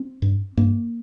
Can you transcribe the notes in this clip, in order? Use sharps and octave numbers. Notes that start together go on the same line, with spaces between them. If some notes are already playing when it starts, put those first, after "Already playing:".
Already playing: C4
G2
G2 A#3